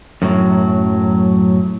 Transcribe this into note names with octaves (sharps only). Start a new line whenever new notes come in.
F#2 A2 F#3